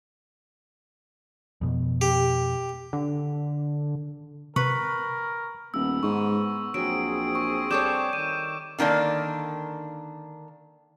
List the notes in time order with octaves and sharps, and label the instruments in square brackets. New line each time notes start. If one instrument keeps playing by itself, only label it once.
[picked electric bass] F2 B2
[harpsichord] G4
[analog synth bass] D3
[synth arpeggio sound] C3 [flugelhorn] A#4 [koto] B4 [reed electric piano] C#6
[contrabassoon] D#1 [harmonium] B3 [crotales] E6
[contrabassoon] G#2 [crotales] C#6
[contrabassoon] A#1 [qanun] F#3 [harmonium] C4 G#4 [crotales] D7
[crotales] C#6
[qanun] G3 A4 C#5 [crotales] D6 G6 E7
[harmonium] D#3 [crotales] D#7
[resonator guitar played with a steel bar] D3 D#3 A#3 D4